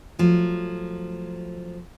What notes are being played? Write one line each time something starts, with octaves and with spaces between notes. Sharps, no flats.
F3 F#3 A3